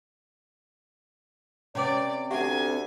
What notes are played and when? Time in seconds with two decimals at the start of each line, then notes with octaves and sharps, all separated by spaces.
1.75 C3 B3 C#4 C#5 D5 G5 D6
2.30 D2 G4 E5 F#5 G#5